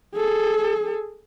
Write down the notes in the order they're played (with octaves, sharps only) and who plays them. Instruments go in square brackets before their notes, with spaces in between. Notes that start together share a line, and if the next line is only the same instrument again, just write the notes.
[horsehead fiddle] G#4 A4